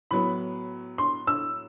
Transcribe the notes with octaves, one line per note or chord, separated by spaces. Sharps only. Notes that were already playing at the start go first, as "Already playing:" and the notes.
A2 F#3 B3 B5
C6
E6